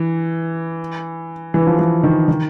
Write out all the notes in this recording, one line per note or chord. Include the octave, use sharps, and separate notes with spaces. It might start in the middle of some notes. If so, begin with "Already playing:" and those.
Already playing: E3
E3
F3
E3
D#3
D#3